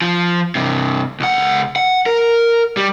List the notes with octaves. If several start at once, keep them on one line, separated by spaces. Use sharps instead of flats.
F3
G2 C3
C#2 F#5
F#5
A#4
G3